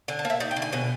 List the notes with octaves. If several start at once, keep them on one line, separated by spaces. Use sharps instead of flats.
D3 G#5
A5
A#3
E5
D#4 D5
G5
D3
G#5
B2 G#5